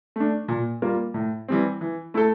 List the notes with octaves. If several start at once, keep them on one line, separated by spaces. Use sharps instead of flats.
A3 D4
A#2
G3 A#3 F4 A#4
A2
E3 G3 C4
E3
A3 E4 A4